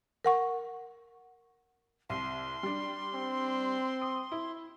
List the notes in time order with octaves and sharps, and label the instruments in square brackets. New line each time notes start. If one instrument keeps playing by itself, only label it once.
[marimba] A#4 F#5 C#6
[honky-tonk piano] C2 [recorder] C6
[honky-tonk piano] G3 D4
[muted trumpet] C4
[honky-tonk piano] D#6
E4